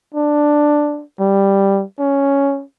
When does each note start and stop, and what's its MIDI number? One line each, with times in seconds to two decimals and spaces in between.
0.14 1.03 62
1.20 1.84 55
1.99 2.63 61